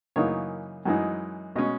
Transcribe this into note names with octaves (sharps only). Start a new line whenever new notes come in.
F#2 C#3 E3 A#3 D#4 C#5
F#2 E3 G#3 D#4
B2 G#3 C#4 D#5